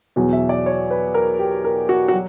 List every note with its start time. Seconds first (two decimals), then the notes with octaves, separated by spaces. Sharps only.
0.16 E2 B2 F#3
0.33 E5
0.49 D5
0.66 C#5
0.91 B4
1.14 A#4
1.39 G4
1.65 A#4
1.89 F#4
2.08 F#4
2.13 F#3